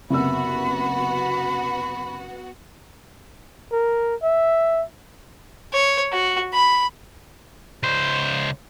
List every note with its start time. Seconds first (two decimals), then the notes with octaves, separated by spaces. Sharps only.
0.10 F#1 C3 B3 F#4 F#5 B5 E6
3.72 A#4
4.23 E5
5.73 C#5
6.12 F#4
6.53 B5
7.83 C#2 C5